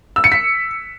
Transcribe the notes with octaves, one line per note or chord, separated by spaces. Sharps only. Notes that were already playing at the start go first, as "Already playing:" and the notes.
E6
C#7
B6